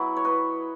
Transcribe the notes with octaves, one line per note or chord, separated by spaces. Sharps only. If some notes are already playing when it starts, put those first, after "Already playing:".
Already playing: F#3 B3 E4
C#5
B4 D#5